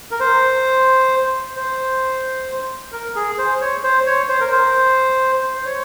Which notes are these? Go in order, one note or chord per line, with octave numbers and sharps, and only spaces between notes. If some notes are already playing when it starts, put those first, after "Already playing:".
A#4
C5
C5
A#4
G#4
C5
C#5
C5
C#5
C5
A#4
C5
C5
C#5